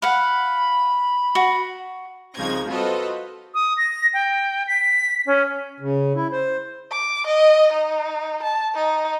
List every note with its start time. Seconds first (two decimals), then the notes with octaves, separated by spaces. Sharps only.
0.02 F5 F#5 B5
1.35 F#4
2.36 C2 C#3 F3 D#4 G#6 A#6
2.70 F4 F#4 A4 B4 C5 D#5
3.54 D#6
3.77 A#6
4.14 G5
4.68 B6
5.26 C#4
5.80 C#3
6.15 E4
6.32 C5
6.91 D6
7.27 D#5
7.73 D#4
8.43 A5
8.75 D#4